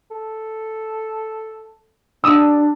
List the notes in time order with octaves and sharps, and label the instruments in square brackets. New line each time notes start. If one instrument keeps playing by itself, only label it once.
[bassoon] A4
[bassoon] G3 [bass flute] D4 [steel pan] D#6 E6